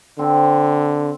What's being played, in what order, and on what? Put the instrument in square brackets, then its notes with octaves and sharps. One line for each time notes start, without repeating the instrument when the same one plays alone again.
[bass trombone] D3 [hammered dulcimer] C4